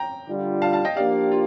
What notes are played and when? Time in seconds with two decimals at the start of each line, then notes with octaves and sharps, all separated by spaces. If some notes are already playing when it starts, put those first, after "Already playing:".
Already playing: G5 A#5
0.27 D3 G3 D4 F4
0.62 F5 A5
0.73 F5 A5
0.85 D#5 G5
0.96 F3 A#3 D4 G4 D5 F5
1.31 F4